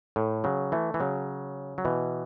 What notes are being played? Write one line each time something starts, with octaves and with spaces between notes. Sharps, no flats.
A2
C#3 F#3
E3 A3
E3
C#3 F#3
F#3
B2 E3